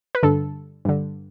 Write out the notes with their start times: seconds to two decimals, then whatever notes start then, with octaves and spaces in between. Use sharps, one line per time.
0.15 B4
0.23 G2 D3 A4
0.85 G2 D3